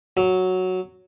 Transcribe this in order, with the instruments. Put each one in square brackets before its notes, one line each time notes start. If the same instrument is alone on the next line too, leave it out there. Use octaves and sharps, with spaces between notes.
[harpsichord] F#3